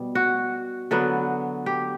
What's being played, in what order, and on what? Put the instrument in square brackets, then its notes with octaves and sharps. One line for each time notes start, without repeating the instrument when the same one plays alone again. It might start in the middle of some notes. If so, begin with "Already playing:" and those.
Already playing: [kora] B2 G3
F#4
D3 F#3 B3
G4